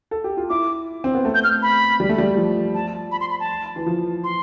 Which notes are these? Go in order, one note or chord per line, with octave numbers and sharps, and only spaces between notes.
A4
G4
F4
E4 D6
C4
B3
A3
G6
F6
B5
G3
A3
G3
F3
A5
B5
C6
B5
A5
E3
F3
C6